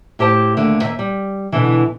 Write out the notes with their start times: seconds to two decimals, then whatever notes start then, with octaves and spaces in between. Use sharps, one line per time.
0.19 A2 G4 C5 A5
0.57 D#2 D3 A3
0.81 D#2 B2 E5
0.99 G3
1.52 B2 D3 E3